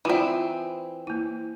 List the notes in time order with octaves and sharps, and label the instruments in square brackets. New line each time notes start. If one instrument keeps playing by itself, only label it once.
[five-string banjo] E3 C4 [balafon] E4 F4 D5
[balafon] A#3 E4